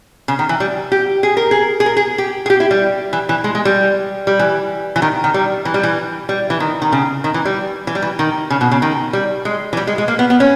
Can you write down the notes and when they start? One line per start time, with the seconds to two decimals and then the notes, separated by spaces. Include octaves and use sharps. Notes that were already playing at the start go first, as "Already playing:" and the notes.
0.28 C#3
0.39 D#3
0.49 E3
0.60 G3
0.92 G4
1.23 G#4
1.37 A#4
1.51 G#4
1.80 G#4
1.86 A#4
1.97 G#4
2.18 G4
2.46 G#4
2.50 G4
2.60 E4
2.71 G3
3.13 E3
3.29 E3
3.44 G#3
3.55 G#3
3.65 G3
4.27 G3
4.39 E3
4.96 E3
5.02 D#3
5.24 D#3
5.34 G3
5.65 E3
5.74 G3
5.83 E3
6.29 G3
6.50 E3
6.60 D#3
6.82 D#3
6.92 C#3
7.24 D#3
7.34 E3
7.45 G3
7.87 E3
7.95 G3
8.02 E3
8.19 D#3
8.50 C#3
8.61 B2
8.72 C#3
8.82 D#3
9.13 G3
9.45 G#3
9.73 E3
9.77 G3
9.87 G#3
9.98 G#3
10.08 A#3
10.19 B3
10.30 B3
10.40 C#4